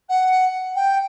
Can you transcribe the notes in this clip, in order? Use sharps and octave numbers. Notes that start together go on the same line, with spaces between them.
F#5
G5